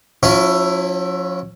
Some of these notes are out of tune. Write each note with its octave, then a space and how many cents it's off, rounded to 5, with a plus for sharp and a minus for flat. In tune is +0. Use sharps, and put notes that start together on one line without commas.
F3 +40 C#4 +0 E4 +10